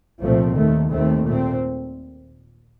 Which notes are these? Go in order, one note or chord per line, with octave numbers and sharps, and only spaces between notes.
C2 A#2 F3 A3 C4
D#2 D#3 A3
D#2 D#3 A3 C4
A#2 A3 C4